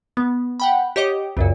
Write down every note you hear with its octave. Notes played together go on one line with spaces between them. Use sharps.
B3
F#5 G5 B5
G4 C#5 D#5 D6
C#2 F#2 A#2